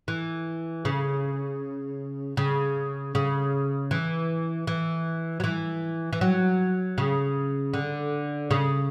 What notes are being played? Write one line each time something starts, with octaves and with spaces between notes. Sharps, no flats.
E3
C#3
C#3
C#3
E3
E3
F#3
E3
E3
F#3
C#3
D3
C#3